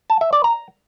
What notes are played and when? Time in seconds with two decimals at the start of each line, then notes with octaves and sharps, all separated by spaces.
0.10 A5
0.21 E5
0.33 D5
0.44 A#5